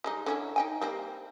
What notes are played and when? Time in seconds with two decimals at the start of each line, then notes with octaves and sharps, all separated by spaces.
0.04 G3 G#3 D#4
0.26 D3 C#4 E4
0.56 D#4 G5 G#5
0.81 G3 A#3 C4